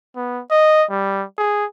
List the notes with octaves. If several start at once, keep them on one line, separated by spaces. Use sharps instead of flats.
B3
D#5
G3
G#4